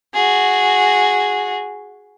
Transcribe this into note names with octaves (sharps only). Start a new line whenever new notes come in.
F#4 G#4